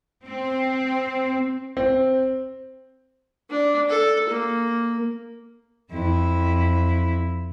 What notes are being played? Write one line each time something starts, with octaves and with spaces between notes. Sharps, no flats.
C4
C4
D4
A4
A#3
F2 E4